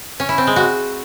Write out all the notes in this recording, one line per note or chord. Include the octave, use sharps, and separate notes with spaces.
C#4
E4
C4
G#3
F#4